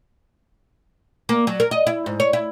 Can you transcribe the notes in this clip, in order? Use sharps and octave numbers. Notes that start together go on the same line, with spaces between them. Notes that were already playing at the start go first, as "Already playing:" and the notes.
A#3
F#3
A#4
D#5
E4
G#2
C#5
E4